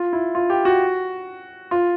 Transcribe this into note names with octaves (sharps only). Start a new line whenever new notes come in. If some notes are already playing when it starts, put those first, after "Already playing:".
Already playing: F4
E4
F4
G4
F#4
F4